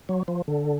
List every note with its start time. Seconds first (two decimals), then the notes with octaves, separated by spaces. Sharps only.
0.09 F#3
0.28 F3
0.48 D3